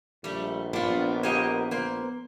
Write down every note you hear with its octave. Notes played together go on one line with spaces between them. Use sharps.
A#1 G3 A3
B3 D4 F4
A#3 G4 D#5
A#3 C5